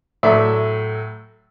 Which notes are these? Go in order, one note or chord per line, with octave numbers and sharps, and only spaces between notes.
A2 F#3 A3 D5 E5